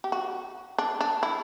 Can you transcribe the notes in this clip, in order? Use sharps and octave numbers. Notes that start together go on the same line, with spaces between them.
G4
F#4
D4
D4
E4